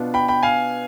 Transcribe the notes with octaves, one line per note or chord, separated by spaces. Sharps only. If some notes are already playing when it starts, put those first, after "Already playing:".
Already playing: B2 B3 D4 F4
G5 B5
G5 B5
F5 G#5